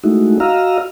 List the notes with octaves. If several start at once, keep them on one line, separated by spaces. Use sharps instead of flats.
G#3 A3 D#4 E4 F#4
F#4 D#5 F5 A#5 E6 F6